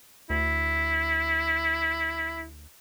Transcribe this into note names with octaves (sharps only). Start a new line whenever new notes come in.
D2 E4